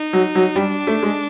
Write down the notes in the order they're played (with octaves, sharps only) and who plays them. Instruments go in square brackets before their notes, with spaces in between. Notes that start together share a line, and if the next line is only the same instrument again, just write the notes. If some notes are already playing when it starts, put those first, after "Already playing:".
Already playing: [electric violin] D#4
[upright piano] F#3
F#3
[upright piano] G3 [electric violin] D4
[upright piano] A3
G#3